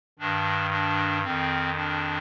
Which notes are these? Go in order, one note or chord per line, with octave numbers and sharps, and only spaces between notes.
G2 D#3 D4
D4
F2 D#3 C4
D4